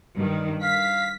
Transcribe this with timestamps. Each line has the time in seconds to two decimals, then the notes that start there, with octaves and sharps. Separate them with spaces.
0.16 G2 D#3
0.63 F5 B6